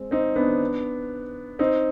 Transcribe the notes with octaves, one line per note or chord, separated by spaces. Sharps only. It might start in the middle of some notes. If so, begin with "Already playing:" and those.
Already playing: G#3 C4
C4 D#4
B3 D4
C4 D#4